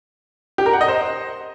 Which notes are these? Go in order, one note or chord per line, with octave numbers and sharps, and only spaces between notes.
G4
A#4
F#5
D#5
C5